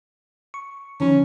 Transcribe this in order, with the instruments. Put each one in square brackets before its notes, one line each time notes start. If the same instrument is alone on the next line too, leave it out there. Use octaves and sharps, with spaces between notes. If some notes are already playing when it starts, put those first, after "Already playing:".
[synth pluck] C#6
[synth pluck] D3 D#3 F3 [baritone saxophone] C#4